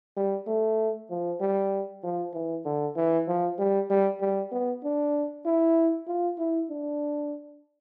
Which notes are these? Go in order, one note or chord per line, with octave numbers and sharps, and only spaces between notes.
G3
A3
F3
G3
F3
E3
D3
E3
F3
G3
G3
G3
B3
D4
E4
F4
E4
D4